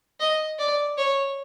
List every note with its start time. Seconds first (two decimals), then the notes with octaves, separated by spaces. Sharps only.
0.20 D#5
0.59 D5
0.97 C#5